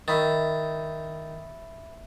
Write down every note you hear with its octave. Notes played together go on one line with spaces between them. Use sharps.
D#3 E5 B5 A6